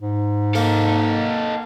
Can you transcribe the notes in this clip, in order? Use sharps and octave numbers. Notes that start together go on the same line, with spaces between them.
G#2
A#3 D#4 A4